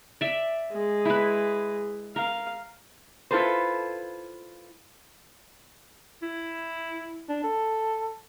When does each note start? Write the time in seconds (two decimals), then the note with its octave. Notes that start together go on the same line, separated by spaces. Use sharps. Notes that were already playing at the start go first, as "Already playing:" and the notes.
0.21 D5 E5
0.72 G#3
1.05 E4 B4
2.16 A#4 F5
3.31 E4 F4 A4 B4 C5
6.22 E4
7.29 D4
7.44 A4